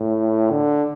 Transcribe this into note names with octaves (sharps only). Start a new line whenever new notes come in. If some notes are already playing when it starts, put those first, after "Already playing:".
Already playing: A2
D3